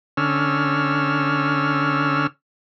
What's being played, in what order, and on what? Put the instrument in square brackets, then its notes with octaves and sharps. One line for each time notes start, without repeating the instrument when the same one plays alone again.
[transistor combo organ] D3 C#4 E6 F6